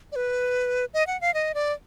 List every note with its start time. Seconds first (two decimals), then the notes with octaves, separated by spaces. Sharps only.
0.12 D5
0.16 B4
0.94 D#5
1.07 F#5
1.21 F5
1.34 D#5
1.54 D5